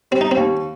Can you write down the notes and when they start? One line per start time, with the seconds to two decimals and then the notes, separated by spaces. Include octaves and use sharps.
0.11 G3 C4
0.21 D#4
0.31 C4
0.37 D#2